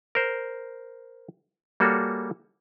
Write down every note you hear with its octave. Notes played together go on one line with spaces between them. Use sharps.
A#4 C5
G3 A#3 F#4 G#4 A4 C#5